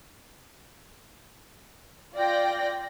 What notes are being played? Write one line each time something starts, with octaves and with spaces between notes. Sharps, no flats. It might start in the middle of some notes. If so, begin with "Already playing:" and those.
F4 D5 G5 A#6